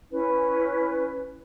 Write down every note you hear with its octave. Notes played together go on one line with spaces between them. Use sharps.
C#4 E4 B4